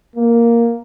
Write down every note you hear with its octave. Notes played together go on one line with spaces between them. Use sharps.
A#3